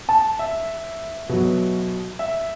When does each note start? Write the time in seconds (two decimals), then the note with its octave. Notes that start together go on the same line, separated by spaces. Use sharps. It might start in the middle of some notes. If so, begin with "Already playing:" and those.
0.09 A5
0.39 E5
1.29 B2 F#3
2.19 E5